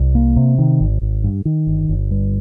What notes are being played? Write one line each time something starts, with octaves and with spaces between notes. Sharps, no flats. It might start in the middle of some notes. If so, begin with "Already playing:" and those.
Already playing: C2
A#3
C3
D#3
G#1
G#1
G2
D#3
G1
G1
G2